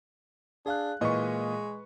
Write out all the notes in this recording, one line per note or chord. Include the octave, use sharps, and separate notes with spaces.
D4 G#4 F5 F#6
A#2 E3 G#3 B4 D#5 C#6